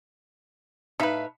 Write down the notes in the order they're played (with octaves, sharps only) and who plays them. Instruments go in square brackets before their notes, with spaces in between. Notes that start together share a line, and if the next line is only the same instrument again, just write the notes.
[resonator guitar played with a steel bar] A2 E5 F5 [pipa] D#4 B4